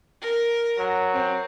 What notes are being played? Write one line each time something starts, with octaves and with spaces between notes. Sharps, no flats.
A#4
F#3
C4